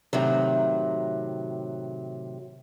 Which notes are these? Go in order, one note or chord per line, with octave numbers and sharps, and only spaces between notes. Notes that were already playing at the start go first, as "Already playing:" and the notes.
A2 C3 D#3 F#3